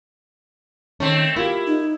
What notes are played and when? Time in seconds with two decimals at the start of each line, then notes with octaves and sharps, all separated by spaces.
1.00 D#3 A3 C4 C#4
1.36 A#3 E4 F4 G4
1.67 D#4